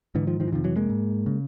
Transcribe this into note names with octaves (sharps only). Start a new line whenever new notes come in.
G#2 D3 E3
D#3 F3
D#3 F3
E3
F2 C3 D#3 F3
E3 F#3
G#3 A#3
G#2
C#3